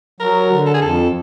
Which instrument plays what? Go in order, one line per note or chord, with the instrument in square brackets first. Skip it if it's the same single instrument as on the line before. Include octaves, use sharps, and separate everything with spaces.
[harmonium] F#3 [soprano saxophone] A#4
[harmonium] D3
[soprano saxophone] A4
G#4
[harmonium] F2 [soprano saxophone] A4